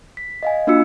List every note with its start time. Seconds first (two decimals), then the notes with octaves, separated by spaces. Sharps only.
0.17 B6
0.43 D#5 F5 G#5
0.67 A#3 D4 F4 F#4 E6 C#7